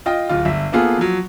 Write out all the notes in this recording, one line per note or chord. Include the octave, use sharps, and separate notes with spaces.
F4 D#5 G5
D1 F4
G1 E5
A#3 B3 F4 G#4 A4
F3 F#3